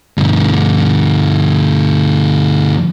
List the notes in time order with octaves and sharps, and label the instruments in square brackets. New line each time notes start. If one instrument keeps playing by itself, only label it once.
[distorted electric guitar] D2 G2